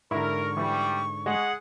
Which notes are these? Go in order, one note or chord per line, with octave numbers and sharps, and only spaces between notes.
G#2 D3 E4 A#4 C#6
E3 G3
G#3 G#4 F#5